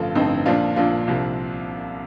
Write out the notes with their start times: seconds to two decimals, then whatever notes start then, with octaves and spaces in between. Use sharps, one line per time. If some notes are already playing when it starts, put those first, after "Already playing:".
Already playing: A1 G2 D3 F3 F4 A4
0.15 A1 G2 D3 F3 C4 D#4
0.46 A#1 A#2 F3 D4 F4
0.76 A#1 A#2 F3 D4 F4
1.07 C2 C3 F3